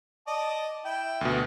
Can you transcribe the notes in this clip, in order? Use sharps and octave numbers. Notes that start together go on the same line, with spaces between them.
D5 D#5 A5
E4 G5
D2 B2